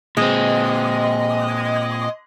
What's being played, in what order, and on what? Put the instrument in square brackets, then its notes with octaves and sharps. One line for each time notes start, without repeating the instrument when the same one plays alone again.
[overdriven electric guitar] A#2 C4 [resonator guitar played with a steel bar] G#3 [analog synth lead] D#5